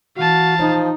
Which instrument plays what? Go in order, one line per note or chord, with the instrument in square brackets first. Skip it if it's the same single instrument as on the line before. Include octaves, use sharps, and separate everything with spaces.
[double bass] E3 [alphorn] F#4 [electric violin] F5 A5
[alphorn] F3 [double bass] D#4